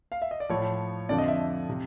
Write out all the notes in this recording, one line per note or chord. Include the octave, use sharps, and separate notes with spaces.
F5
E5
D#5
D5
A2 F3 C#5
F2 D3 F3 D5
D#5
E5
C3